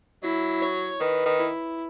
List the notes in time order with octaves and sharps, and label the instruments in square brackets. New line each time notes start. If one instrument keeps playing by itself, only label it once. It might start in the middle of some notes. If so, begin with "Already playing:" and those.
[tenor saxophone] F#3 [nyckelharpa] E4
[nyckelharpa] C#5
[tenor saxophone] D#3 [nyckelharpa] B4
[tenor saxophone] D#3
[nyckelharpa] E4